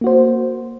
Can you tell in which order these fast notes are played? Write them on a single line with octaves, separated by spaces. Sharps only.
A#3 F#4 C5